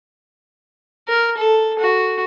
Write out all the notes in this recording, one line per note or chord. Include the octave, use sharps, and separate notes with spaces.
A#4
A4
F#4